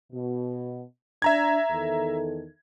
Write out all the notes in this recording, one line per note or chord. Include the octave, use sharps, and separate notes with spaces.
B2
D4 E5 A#5 G#6
E2 D#3 A4